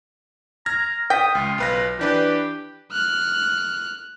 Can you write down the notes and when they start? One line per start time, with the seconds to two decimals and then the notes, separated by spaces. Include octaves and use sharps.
0.66 A#5 F6 G#6 A#6
1.10 G5 D#6 G6 B6
1.35 C#2 F4
1.58 B1 B4 A#6
1.99 E3 D4 G4 B4
2.92 F6 F#6